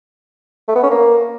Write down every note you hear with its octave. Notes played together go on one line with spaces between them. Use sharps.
A3
B3
C#4
A#3